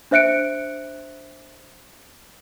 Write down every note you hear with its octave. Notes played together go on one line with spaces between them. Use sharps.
D4 C5 E5 F#6 C#7 D7